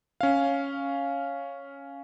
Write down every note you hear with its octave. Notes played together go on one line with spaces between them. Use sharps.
C#4 F5